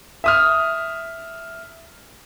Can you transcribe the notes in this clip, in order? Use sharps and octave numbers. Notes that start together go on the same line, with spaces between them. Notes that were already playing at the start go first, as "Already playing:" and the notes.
E5 D#6 F6